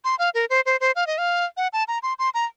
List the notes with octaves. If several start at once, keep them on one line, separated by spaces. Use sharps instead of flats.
C6
F5
A#4
C5
C5
C5
F5
D#5
F5
F#5
A5
A#5
C6
C6
A#5